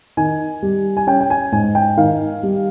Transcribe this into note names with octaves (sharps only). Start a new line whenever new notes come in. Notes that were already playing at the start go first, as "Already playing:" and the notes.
D#3 G#5
G3
G#5
C#4 G5
G5
G#5
G#2 G#5
G5
D#3 F5
G3